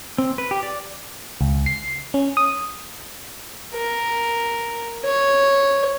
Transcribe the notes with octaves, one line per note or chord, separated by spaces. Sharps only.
C4
B4
G4
D5
C#2
C7
C#4
D#6
A#4
C#5